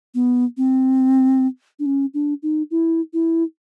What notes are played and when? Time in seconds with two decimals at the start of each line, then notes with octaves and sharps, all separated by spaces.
0.15 B3
0.57 C4
1.79 D4
1.86 C#4
2.14 D4
2.43 D#4
2.71 E4
3.13 E4